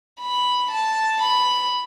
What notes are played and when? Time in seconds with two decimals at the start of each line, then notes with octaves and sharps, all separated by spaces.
0.20 B5
0.71 A5
1.22 B5